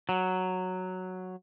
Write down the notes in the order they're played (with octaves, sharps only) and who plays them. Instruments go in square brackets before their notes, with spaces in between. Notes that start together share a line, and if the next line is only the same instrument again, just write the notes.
[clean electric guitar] F#3